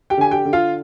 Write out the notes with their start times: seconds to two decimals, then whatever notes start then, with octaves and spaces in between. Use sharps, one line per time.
0.10 G4 G5
0.18 D3 G#5
0.31 G4 G5
0.45 D3
0.53 F4 F5